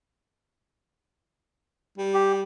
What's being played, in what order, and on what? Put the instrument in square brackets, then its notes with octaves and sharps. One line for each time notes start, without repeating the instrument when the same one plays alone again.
[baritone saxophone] G3
[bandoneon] G4